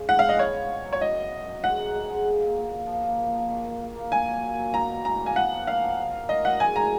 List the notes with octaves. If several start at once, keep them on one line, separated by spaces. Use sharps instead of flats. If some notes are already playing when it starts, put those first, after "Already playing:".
Already playing: C#3 G#3
F3 F#5
B3 F5
D#5
F4 C#5
C#4
F4
F#3
C#5
F#2 D#5
F#2
F#2
F#2
G#3 F#5
D#4
G#2
G#3
A#2
A#2
A#2
A#2
F3
A#3
A#3
F3
D#3
A#3
A#3
A#3
A#2 G#5
F#3
A#2
F#3
A#3 A#5
B2
D#4 A#5
A#3
G#5
D#4 F#5
F3
A#3 F5
F3
D#3
D#3
F#3 D#5
F#3 F#5
G#3 G#5
D#4 A#5